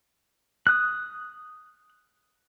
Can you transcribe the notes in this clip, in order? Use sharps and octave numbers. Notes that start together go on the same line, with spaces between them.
D#6 F#6